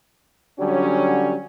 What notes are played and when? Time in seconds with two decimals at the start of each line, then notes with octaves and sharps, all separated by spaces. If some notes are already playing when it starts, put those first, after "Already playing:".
0.59 D3 F#3 G3 C#4